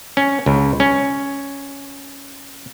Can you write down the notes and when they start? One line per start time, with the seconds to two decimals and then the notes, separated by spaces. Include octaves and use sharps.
0.17 C#4
0.46 C#2
0.80 C#4